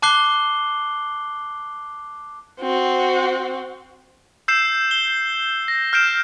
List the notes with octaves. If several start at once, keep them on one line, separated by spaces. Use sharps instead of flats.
A5 D6 F#6 C7 G7
C4 F#4
E6 G6 C7 E7
G7
A#6
F6 G6 C7 D7 E7